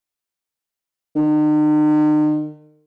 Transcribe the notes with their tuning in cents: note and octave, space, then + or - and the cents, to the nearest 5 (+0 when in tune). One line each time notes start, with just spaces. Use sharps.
D#3 -45